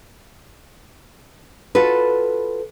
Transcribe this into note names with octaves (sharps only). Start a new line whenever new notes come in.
F4 F#4 A4 B4